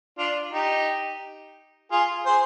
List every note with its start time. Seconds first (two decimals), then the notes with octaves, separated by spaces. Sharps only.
0.18 D4 F4
0.53 D#4 G4
1.92 F4 G#4
2.26 G#4 C5